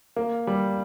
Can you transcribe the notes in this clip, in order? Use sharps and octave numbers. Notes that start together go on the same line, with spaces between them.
A#3
G3